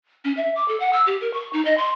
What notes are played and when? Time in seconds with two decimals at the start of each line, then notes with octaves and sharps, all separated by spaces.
0.25 C#4
0.37 E5
0.56 D6
0.68 A4
0.80 F#5
0.93 E6
1.07 G4
1.21 A#4
1.34 C#6
1.53 D#4
1.65 D#5
1.77 C6